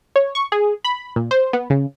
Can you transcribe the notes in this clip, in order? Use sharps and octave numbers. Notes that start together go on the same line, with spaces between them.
C#5
C#6
G#4
B5
A#2
C5
B3
C#3